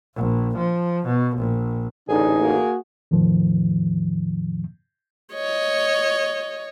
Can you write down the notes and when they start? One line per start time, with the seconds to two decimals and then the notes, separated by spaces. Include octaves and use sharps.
0.16 A#1
0.57 F3
1.06 B2
1.37 A#1
2.09 A1 D3 D#4 G#4
2.40 A#3 F#4
3.11 E2 A2 D#3 F3
5.33 C#5 D#5